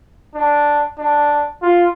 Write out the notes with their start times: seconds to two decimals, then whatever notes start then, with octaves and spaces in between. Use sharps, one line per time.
0.35 D4
0.99 D4
1.62 F4